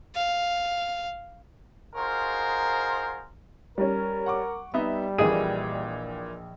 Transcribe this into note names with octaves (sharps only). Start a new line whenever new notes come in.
F5
D#4 F4 F#4 G#4 A#4 C5
G3 C#4 A#4
F#5 C#6 D6
G3 B3 D#4 E5
A#1 A#2 E3 G#4 D#5 D#7